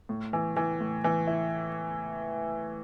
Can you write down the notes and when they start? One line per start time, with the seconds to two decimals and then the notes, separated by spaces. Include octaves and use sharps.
0.09 A2
0.33 E3
0.56 E3
0.80 A2
1.04 E3
1.27 E4